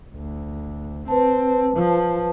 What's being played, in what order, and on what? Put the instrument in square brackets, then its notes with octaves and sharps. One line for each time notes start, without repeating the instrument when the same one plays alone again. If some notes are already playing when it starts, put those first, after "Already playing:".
[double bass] D2
[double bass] C4 [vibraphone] B4 A5
[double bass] F3